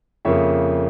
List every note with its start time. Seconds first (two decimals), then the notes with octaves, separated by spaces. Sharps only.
0.25 F2 C#3 F3 A#3 C#5 E5